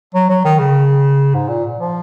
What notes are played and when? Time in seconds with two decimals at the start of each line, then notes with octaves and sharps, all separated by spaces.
0.15 F#3
0.29 F#3
0.45 D#3
0.59 C#3
1.34 G#2
1.49 A#2
1.79 F3